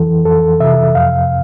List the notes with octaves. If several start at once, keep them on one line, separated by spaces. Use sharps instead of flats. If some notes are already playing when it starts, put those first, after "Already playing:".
Already playing: F2 E3 A4
F2 A4
C3 E5
F2 F5